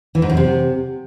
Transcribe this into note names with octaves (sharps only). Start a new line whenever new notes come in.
E3
G#2
F#2
C3